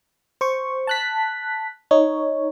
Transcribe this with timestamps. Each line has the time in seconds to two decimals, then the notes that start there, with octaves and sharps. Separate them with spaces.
0.41 C5 C#6
0.87 A5 F#6 B6
1.91 D#4 C#5